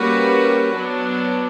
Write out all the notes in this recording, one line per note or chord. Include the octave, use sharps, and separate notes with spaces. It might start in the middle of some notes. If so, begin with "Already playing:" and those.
Already playing: G3 A#3 C#4 F#4 B4
F#3 B3 D4